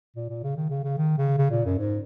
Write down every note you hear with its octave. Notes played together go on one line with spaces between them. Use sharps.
A#2
A#2
C#3
D#3
C#3
C#3
D#3
C#3
C#3
A#2
F#2
G#2